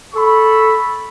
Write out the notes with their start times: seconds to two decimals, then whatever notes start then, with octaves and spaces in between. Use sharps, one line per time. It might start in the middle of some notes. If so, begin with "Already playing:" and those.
0.14 A4 B5 C#6